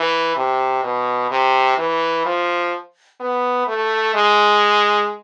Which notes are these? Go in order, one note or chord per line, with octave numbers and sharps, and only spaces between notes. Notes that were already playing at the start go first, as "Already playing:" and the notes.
Already playing: E3
C3
B2
C3
E3
F3
B3
A3
G#3